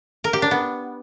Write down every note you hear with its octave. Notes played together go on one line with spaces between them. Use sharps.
A#4
G4
D4
B3